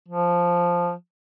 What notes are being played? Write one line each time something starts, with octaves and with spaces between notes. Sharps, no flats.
F3